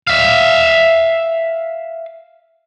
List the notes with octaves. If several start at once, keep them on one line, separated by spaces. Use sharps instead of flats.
E5 F5